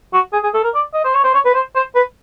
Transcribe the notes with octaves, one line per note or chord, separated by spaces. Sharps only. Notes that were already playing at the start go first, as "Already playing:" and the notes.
F#4
G#4
G#4
A4
A#4
D5
D#5
C5
C#5
C5
C#5
B4
C5
C5
B4